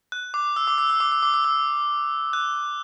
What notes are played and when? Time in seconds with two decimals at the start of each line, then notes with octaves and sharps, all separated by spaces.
0.12 F#6
0.34 D6
0.56 E6
0.67 D6
0.78 E6
0.90 E6
1.00 D6
1.12 E6
1.23 D6
1.34 E6
1.45 E6
2.33 F#6